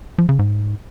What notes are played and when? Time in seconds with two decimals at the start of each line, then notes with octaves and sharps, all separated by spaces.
0.18 F3
0.29 C#3
0.39 G#2